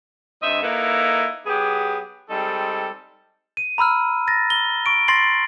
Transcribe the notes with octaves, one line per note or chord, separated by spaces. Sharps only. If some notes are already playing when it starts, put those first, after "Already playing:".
G2 C4 D#4 D#5 E5
A#3 D#4 E4 A4 B4
F#3 B3 G4 G#4
G3 G#3 C4 D#4 A4
D#7
A#5 B5 E6 F6
A6 A#6
G7
C#6 D7
C6 A6 A#6 C7 F#7